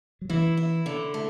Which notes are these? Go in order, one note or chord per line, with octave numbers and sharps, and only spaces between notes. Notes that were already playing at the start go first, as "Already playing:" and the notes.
F#3
E3 E4
E4
D3
A3